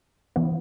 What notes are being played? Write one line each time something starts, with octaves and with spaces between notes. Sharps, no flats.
E3 B3